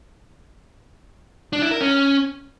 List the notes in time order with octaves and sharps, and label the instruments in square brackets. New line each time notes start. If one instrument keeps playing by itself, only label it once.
[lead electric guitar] D4
E4
A#4
C#4